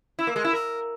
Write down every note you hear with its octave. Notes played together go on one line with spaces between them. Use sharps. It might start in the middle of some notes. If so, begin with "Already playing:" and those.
E4
A#3
G#3
E4
A#4